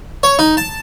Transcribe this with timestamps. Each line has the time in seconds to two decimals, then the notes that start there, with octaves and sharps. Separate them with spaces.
0.23 C#5
0.39 D#4
0.57 A5